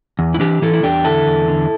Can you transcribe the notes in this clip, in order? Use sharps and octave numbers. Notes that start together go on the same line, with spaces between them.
E2
E4
E3 D4 G4
E3 E4 A4
E4
E2 D4 G4
D3 E4 A4
E2
D3